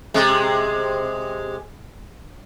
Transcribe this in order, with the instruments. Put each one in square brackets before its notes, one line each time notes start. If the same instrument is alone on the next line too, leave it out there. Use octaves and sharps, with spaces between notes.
[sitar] C3 G#3